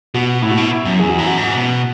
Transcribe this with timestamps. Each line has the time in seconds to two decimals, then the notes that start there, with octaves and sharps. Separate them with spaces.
0.14 B2 F#4
0.42 A2 E4
0.51 F#4
0.57 B2 E4
0.71 E4
0.85 F#2
0.99 E2 G#4
1.09 F#4
1.18 F#2 E4
1.26 F#4
1.37 G#2
1.56 B2